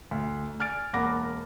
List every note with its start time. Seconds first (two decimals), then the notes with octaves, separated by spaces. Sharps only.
0.11 D2
0.60 G#5 F6 A6 D7
0.93 E1 A#3 F#5 B5 D6 A#6